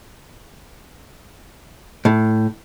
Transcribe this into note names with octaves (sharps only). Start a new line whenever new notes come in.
A2